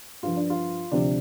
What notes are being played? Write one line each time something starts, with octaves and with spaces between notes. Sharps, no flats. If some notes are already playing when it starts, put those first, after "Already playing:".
G2 F3 F4
D4
F4
D2 C3 F3 D4